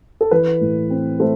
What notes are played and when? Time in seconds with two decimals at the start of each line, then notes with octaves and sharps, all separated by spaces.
0.21 A4
0.31 E3 B4
0.61 A2
0.90 C4
1.20 A3 C5